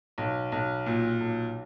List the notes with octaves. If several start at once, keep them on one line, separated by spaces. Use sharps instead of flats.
B1
B1
A#2
B1